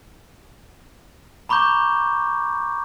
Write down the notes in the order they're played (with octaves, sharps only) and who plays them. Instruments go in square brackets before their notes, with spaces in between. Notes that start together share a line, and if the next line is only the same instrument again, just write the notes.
[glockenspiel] A#5 B5 C#6 D6 G6